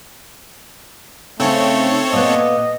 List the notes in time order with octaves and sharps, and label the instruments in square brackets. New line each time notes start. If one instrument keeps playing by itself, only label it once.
[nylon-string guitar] C#3 D#4 [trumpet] A3 [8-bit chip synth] C4 A4 C#5
[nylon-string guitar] A#2 B3 [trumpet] D#5